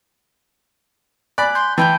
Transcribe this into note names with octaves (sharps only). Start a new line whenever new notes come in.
D5 G#5 B5 F#6
C6 G6
E3 G5 A5 B5 G6